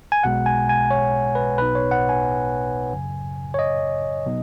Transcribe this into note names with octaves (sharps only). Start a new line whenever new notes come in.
G#5
B1 B2 G#3 F#5
G#5
G#5
C#5
B4
B1 B2 B3 D#4 B4
C#5
F#5
G#5
F#2 C#3 F#3
C#5
D#5
B2 F#3 B3 D#4